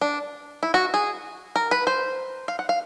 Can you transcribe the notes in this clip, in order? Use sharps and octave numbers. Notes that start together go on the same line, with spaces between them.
D4
E4
F#4
G#4
A#4
B4
C5
F5
F#5
F5